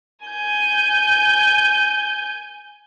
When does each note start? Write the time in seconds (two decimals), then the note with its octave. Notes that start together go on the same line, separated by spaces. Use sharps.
0.26 G#5 G6